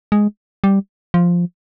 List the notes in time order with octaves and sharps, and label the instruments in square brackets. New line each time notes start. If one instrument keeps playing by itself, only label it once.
[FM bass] G#3
G3
F3